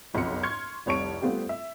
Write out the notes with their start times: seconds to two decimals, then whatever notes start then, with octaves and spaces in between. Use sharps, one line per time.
0.14 F#1 B1 F2 F#3 C6 C#7
0.43 C6 C#6 F6 G#6 C#7
0.86 F1 C2 C#5 A5 C#6 D7
1.21 G3 A3 B3 C4 F4 G4
1.49 E5